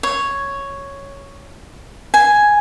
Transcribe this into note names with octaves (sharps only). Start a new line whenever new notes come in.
C#5
G#5